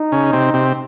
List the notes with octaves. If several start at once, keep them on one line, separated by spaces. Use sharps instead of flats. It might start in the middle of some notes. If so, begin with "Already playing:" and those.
Already playing: D#4
C#3 C#4
C3 C4
C3 C4